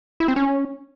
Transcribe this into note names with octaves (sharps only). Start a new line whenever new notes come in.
E4
C4
C#4